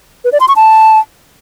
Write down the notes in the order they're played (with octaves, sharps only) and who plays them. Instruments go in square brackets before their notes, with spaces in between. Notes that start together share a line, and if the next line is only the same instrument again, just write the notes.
[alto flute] B4
D5
C6
C#6
A5